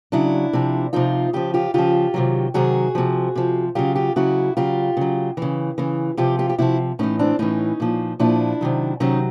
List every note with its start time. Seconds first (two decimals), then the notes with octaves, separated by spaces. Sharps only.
0.12 C#3 F#3 D4 E4
0.53 C3 F3
0.93 C3 F3 D#4 F4
1.33 C#3 F3 F4 G4
1.54 F4 G4
1.74 C#3 F3 F4 G4
2.14 C3 D#3 F#3
2.54 C3 D#3 F#3 F#4 G#4
2.95 C3 F3
3.36 C3 F3
3.75 C#3 F#3 F4 G4
3.95 F4 G4
4.16 C#3 F#3 E4 F#4
4.57 C#3 F#3 F4 G4
4.97 C#3 F#3
5.37 C#3 E3
5.78 C#3 E3
6.17 C3 F3 F4 G4
6.39 F4 G4
6.49 G4
6.58 C3 F3 E4 F#4
6.99 A2 E3 C#4 D#4
7.19 C4 D4
7.39 A2 E3 C#4 D#4
7.80 A#2 F3
8.20 A#2 F3 D4 E4
8.61 C3 D#3 F#3
9.00 C3 D#3 F#3 C#4 D#4